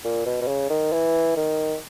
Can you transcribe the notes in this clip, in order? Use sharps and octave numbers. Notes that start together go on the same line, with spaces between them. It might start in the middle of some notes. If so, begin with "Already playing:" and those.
A#2
B2
B2
C#3
D#3
E3
D#3